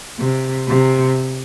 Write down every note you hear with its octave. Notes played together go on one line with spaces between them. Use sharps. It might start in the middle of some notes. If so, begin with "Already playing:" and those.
C3
C3